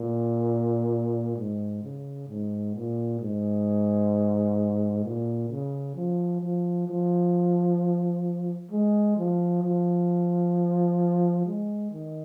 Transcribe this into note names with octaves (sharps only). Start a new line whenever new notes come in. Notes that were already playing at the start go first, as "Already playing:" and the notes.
Already playing: A#2
G#2
C#3
G#2
A#2
G#2
A#2
C#3
F3
F3
F3
G#3
F3
F3
G#3
D#3